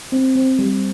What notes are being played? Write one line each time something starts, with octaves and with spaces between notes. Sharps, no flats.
C4
C4
G3